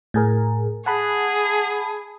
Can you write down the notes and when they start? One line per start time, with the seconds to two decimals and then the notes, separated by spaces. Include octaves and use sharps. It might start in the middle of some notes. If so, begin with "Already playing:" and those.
0.14 A2 G#4 A#4
0.86 G#4 F#5 A5 B5